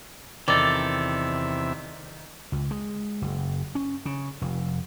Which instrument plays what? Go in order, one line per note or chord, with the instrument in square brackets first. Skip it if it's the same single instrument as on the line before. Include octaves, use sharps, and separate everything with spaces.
[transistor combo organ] E2 C3 E5 [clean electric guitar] D#3 A4 [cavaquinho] D5
[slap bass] C#2
G#3
F#1
C#4
C#3
F1